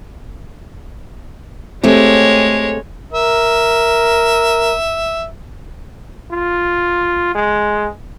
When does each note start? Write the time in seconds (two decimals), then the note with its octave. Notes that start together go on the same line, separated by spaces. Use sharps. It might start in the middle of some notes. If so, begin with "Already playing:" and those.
1.84 G#3 A3 C4 G4 C#5
3.13 A#4 E5
6.32 F4
7.35 G#3